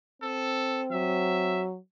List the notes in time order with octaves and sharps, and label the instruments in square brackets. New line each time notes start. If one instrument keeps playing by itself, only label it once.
[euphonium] C4 [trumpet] A4
[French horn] F#3 [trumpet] E5